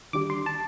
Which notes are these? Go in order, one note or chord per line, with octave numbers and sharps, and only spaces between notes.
D#2 D3 G3 D6
C6
A5